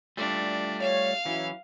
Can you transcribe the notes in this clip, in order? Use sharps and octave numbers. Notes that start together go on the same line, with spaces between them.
G3 A3 D4 F4
C#5 F5
E3 F#3 C#4 E4